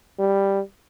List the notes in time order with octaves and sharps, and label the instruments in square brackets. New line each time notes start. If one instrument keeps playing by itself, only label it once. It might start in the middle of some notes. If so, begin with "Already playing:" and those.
[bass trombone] G3